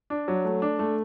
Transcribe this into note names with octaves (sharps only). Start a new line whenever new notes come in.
D4
F#3
A3
D4
A3